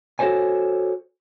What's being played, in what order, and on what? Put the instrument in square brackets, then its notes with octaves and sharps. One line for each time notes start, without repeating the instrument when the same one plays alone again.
[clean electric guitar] F#4 A4 A#4 C5 C#5 G#5